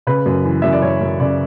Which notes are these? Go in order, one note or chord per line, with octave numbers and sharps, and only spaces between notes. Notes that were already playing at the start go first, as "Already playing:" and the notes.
C#3 B4
F#2
E3
F#2 E5
D5
F#2 C#5
F#2
C#3 D5